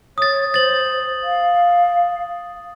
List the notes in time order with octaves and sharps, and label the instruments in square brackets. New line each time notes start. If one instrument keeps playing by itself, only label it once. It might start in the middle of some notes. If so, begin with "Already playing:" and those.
[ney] C#5 [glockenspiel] D#6 A6
[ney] C5 [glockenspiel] A6 F#7
[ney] F5